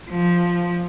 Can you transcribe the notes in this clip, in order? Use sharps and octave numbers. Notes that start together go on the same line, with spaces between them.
F3